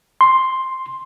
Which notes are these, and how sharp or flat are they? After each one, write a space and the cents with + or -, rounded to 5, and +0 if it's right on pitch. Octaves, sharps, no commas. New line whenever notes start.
C6 +5